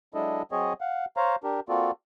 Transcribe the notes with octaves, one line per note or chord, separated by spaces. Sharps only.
F#3 G#3 D4 E4 A4 D#5
F#3 C4 G#4 C#5 D#5
F5 F#5
C5 C#5 F5 A#5
D4 G4 A#4
A#3 C4 F4 F#4 A4 D5